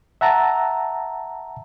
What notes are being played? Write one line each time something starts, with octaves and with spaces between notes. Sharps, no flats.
E5 F#5 A5 A#5